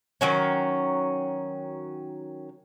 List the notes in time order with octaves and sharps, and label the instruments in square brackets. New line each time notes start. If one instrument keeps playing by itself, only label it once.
[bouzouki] D#3 F#3 C#4